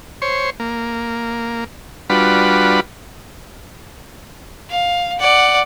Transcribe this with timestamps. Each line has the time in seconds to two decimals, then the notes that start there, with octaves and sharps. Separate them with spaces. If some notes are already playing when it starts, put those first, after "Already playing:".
0.22 C5 C#5
0.60 A#3
2.10 G3 D4 F4 F#4 B4 B5
4.71 F5
5.19 D5 F#5